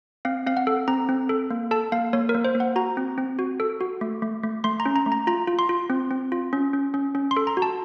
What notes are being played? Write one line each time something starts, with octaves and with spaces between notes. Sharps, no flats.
C4 F5
C4 F5
F#5
A4
C4 A#5
C4
A4
A#3
A4 A5
A#3 F5
A#3 C#5
A#4
A#3
C5
A#3
F#5
F#4 A#5
C4
C4
F#4
A4
F#4
A3
A3
A3
A3 C6
A#5
C#4
A#5
A3
A#5
F4 A#5
F4
C6
F4
C4
C4
F4
C#4
C#4
C#4
C#4
C6
A4
A#5
F#4
A5